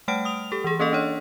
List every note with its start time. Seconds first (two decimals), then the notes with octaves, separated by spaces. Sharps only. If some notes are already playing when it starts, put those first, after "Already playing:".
0.08 G3 A3 F#5 G5 F6 D7
0.25 D#6 F7
0.52 G4 A4
0.64 E3 G#4
0.79 A#3 C#4 A4 D#5
0.93 D4 C#5